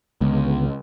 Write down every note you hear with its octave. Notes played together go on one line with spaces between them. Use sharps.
C#2 D3 G#3 B3